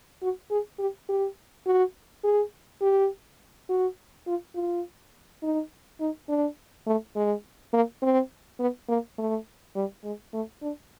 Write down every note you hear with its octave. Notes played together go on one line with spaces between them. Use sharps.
F#4
G#4
G4
G4
F#4
G#4
G4
F#4
F4
F4
D#4
D#4
D4
A3
G#3
A#3
C4
B3
A#3
A3
G3
G#3
A3
D4